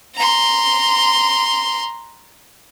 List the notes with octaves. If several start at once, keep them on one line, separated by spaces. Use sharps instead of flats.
A#5 C6